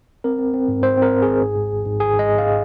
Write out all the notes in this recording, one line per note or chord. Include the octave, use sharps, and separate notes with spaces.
C4 A#4
C4
C4
G#2
G#2 C5
C4 A#4
C4
G#1 G#4
G#2
G#2
G#1
G#2
G#1 G#4
G#2
D#5
G#2
F5